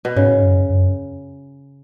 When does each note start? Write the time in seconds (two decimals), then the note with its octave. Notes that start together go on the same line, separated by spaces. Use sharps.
0.05 B2
0.16 G#2 C#3
0.28 A2
0.35 G#2
0.42 F#2
0.70 F#2